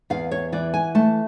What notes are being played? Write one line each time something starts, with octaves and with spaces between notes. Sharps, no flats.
E2 F5
C#5
E3 D5
G#5
A3 A5